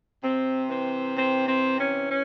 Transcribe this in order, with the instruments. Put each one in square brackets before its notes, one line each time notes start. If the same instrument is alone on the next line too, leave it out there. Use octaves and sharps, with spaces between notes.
[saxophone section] C3 C4
E3 C4
C3 C4
C4
E3
C#4
C#4